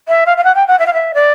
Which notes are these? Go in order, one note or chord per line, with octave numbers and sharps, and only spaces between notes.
E5
F5
F5
F#5
G5
F#5
E5
F5
E5
D5